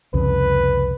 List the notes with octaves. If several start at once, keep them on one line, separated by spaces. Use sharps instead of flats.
C2 F2 C#3 B4